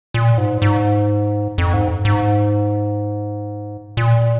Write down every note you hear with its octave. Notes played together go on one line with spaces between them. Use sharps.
A#2
G#2
G#2
F2
G#2
G#2
A#2